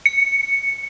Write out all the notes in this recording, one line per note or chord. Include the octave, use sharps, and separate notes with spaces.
C#7